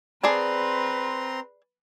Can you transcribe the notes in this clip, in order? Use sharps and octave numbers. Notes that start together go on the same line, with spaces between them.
C4 G#4 B4 D5 A5 A#5 C6